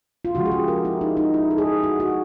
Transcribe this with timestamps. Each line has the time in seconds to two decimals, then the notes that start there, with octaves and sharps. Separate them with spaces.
0.25 F4
0.35 C#3 F3 G#3 F#4
0.46 G#4
0.51 G4
0.68 A#4
0.85 E4
1.01 D#4
1.17 D#4
1.34 E4
1.51 A4
1.58 G#4
1.83 F#4
2.00 F#4